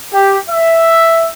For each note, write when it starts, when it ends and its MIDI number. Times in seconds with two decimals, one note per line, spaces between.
0.13 0.37 67
0.49 1.28 76